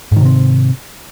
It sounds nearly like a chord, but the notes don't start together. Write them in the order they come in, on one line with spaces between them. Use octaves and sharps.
G#2 D#3 C3 C4